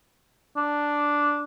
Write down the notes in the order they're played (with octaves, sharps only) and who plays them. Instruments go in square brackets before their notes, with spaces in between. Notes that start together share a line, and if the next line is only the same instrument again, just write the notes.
[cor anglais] D4